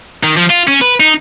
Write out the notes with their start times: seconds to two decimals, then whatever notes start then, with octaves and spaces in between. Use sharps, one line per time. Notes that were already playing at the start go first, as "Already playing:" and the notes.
0.23 D#3
0.37 F3
0.50 F4
0.68 C#4
0.81 B4
1.00 D#4